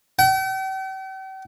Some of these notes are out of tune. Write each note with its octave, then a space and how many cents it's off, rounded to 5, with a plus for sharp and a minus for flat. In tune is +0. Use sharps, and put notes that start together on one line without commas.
G5 -45